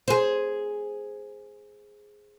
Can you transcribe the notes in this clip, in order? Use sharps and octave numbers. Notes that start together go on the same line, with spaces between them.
G#4 C5